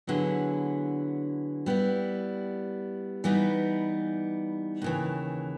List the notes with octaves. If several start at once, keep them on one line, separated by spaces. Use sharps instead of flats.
D3 F#3 B3 E4 G#4
G3 B3 E4
E3 G3 B3 D#4
D#2 C#3 E3